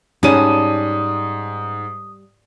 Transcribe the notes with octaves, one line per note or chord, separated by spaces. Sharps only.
G#2 G3 C#4 F#5 A5 D#6 D#7